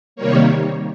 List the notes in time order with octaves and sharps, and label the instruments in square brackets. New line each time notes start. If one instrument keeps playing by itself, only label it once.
[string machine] C3 D#3 G3 A#3 C#5